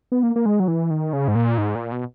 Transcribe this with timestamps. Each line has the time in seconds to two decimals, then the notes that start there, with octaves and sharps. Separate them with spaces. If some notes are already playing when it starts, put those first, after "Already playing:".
0.12 B3
0.23 A#3
0.36 A#3
0.46 G#3
0.60 F#3
0.68 E3
0.91 D#3
1.13 C#3
1.28 G#2
1.35 A#2
1.58 G#2
1.75 A#2
1.92 B2